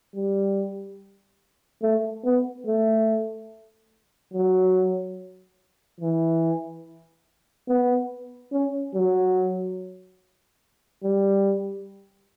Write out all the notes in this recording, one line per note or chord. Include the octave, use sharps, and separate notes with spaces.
G3
A3
B3
A3
F#3
E3
B3
C#4
F#3
G3